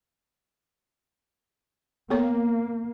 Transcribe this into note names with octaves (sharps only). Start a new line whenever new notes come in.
A#3 B3 A4 C#5